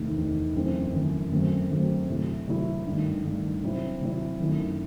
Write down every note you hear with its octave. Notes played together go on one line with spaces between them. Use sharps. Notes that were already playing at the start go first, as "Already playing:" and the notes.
Already playing: E2 C3 D#3 A3 D#4
E2 C3 D#3 A3 D#4
F#2 E3 A3 C4
F#2 E3 A3 C4
F#2 F#3 A3 C4
F#2 F#3 A3 C4
C3 F#3 A3 E4
C3 F#3 A3 E4
G2 D#3 A3
G2 D#3 A3
C3 F#3 C4 E4
C3 F#3 C4 E4
F#2 D#3 A3 E4